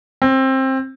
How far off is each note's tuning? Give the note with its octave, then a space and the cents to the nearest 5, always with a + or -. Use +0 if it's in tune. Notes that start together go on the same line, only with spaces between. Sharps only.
C4 +20